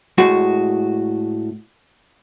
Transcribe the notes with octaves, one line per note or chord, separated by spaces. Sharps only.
A2 G#3 F#4